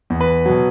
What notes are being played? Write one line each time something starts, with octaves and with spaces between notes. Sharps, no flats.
E2
B4
B2 F#3